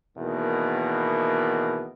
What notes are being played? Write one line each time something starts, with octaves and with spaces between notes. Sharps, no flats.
E2 B2 D#3 A#3